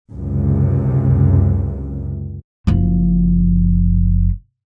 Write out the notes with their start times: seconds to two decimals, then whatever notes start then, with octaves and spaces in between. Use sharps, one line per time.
0.11 C#2 F#2 C3
2.67 F#1 F3